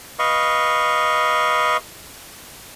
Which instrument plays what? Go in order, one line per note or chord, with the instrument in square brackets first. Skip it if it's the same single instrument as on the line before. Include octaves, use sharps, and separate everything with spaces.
[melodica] B4 D#5 F5 C#6